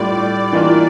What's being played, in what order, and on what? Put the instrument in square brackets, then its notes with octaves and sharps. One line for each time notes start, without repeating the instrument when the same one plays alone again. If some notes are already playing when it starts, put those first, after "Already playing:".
Already playing: [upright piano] A2 G3 D4 F4 [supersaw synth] D5
[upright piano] E3 A#3 D4 F4